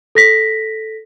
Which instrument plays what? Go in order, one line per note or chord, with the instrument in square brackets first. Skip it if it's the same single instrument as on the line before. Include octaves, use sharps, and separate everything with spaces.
[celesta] A4 A#6 B6